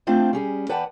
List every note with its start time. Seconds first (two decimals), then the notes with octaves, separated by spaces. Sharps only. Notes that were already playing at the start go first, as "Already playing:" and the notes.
0.07 A3 C4 D4 F4 C5 G5
0.33 G3 C#4 G#4
0.69 E2 B4 D5 F#5 G5 A5